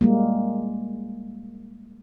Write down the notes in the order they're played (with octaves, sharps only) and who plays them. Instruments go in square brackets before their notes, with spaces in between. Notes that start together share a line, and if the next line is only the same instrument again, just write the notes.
[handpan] G3 G#3 A#3